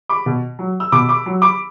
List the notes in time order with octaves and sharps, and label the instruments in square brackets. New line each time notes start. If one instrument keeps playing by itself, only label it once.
[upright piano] B5 D6
B2
F#3
E6
B2 B5 D6
B5 D6
F#3
B5 D6